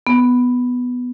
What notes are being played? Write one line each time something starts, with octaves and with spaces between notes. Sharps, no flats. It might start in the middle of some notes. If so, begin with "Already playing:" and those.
B3